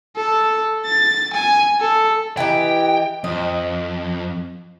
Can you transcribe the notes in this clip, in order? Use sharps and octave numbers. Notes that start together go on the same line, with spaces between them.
A4
A6
G#5
A4
E3 D#4 G4 G5
F2 D#5